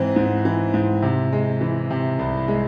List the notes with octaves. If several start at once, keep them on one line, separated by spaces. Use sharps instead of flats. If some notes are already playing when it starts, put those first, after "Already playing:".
Already playing: G#2 E3 C4
G#2
E3
G#2
C3
G#3
E3
C3
C2
G#3